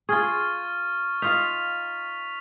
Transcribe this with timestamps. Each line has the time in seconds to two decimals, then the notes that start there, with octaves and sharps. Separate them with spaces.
0.09 F4 G#4 C#6 F6 A6
1.22 D#4 F4 F5 B6 F7